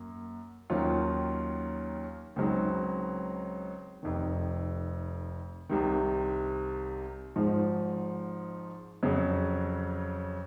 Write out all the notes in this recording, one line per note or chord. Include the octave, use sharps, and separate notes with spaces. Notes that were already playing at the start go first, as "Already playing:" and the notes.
Already playing: F#2 A#3
D#2 D#3 F#3 C#4 F4
C#2 C#3 F#3 C4 D#4
F1 F2 D#3
C2 C3 D#3
G#1 G#2 F3 G#3 D#4
F2 C#3 F#3